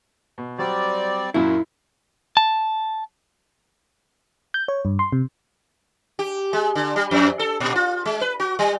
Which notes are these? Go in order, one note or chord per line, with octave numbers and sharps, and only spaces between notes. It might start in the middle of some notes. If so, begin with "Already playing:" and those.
B2
F#3 G3 C4 D5
F#2 A#2 F#3 E4
A5
G6
C#5
G2
C6
C3
G4
G#3
D3
G3
F2
A4
A#2
F4
G#3
B4
F#4
G3